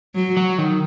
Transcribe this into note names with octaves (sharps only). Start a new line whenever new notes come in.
F#3
F#3
D#3